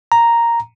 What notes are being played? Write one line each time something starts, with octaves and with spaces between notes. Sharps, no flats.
A#5